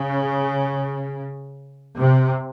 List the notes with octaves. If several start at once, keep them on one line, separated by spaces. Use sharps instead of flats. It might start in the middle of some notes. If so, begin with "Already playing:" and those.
Already playing: C#3
C3